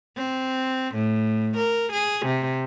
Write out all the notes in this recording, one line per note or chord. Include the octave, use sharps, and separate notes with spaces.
C4
A2
A#4
G#4
C3